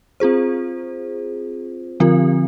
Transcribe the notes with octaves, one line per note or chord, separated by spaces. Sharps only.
C4 F4 G#4 C5
D3 F3 C4 F4 A#4